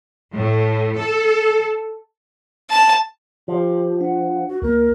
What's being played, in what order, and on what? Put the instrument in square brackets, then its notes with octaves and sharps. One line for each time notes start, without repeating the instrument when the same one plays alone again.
[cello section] A2
A4
[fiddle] A5
[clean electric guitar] F3 [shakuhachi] G4
[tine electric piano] D4 [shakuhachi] F#5
[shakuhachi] F#4
[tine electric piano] D2 A#3 [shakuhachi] A#4